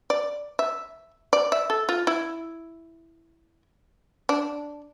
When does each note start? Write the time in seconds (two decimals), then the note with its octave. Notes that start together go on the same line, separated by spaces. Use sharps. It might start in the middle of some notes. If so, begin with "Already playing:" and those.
0.10 D5
0.59 E5
1.33 D5
1.52 E5
1.70 A4
1.89 F4
2.07 E4
4.29 D4